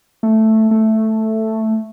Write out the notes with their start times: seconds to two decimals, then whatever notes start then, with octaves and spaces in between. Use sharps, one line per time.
0.23 A3
0.71 A3